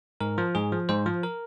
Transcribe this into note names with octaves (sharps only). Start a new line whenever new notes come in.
G#2 A#4
F3
G#2 G#4
F3
G#2 C5
F3
A#4